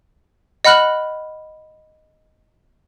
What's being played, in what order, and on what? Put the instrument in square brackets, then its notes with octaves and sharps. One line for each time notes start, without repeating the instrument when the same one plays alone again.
[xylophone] D#5 F#5 B5 F6 F#6 F#7